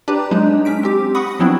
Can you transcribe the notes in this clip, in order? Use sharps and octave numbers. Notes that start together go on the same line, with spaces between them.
D4 G4 B4 D5 A#5
F#3 G#3 D4 D#4
C#4 B6 D7
C4 G4
F#5 B5 C#6 D#6 A#6
F3 F#3 B3 C4 D4 E4